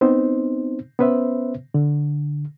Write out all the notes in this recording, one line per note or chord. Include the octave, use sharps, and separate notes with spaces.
B3 C4 D#4 C5
B3 C#4 B4 C5 E5
D3